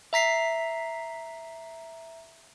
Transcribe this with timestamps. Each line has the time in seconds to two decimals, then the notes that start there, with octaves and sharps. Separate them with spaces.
0.13 E5 A#5 B6 C7